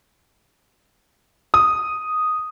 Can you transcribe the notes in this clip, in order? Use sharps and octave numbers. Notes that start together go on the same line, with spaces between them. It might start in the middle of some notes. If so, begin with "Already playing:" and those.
D#6